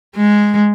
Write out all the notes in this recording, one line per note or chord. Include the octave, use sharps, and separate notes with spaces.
G#3